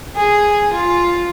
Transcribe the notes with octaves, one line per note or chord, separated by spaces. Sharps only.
G#4
F4